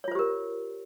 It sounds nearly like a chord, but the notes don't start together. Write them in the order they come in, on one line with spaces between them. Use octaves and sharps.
C#5 F4 C5 G4 A#4